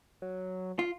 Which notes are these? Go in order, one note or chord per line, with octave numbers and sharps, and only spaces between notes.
F#3
F4